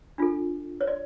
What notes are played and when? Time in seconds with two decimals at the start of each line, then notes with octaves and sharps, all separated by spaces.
0.18 D4 F4 A4
0.81 C#5
0.87 D5